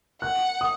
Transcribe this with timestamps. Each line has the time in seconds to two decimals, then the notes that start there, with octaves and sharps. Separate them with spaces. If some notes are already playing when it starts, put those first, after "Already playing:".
0.22 F#5 F#6
0.61 D#6